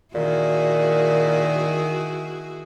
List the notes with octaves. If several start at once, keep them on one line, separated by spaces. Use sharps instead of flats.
A#2 D#3 E4 F#4 G#4